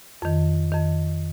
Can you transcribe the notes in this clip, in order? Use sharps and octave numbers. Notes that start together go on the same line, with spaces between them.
F2 D#3
F2 D#3